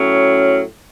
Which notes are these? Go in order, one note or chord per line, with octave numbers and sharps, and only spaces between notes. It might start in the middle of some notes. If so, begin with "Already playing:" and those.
Already playing: A2 F#3 C#4